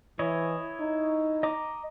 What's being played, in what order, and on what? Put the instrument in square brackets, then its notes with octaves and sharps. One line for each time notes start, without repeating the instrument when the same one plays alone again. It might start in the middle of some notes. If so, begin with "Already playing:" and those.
[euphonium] E3 [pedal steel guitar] E4 C#5 D#5
[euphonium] D#4
[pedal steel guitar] D#5 A#5 D6